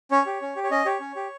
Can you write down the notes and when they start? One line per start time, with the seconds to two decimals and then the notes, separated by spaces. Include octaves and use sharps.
0.11 C#4 C#5
0.26 G4
0.42 C#4
0.56 G4
0.63 C#5
0.71 C#4 D#5
0.85 G4 C#5
1.00 C#4
1.16 G4